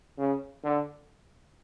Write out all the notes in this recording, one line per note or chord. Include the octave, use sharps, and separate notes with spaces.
C#3
D3